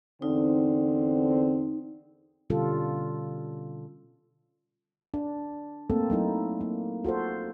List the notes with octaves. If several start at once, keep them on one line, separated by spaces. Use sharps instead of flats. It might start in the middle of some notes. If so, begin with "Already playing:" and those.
E2 D3 C4 D#4
B2 D3 G3 C#4 F4 A4
D4
A3 A#3 C4 A4
F#3 A3 D#4 E4
A#3
F4 F#4 A4 C5